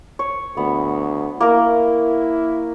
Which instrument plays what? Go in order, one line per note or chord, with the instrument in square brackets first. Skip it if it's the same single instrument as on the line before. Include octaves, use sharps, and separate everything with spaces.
[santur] C#5
[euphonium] D2 [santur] B3
[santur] A#3 A#4 [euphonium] E4